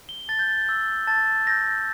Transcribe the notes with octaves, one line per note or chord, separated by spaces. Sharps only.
G7
A5 A6
G6
A6
E6 G6
A5 A6
E6 G6 A#6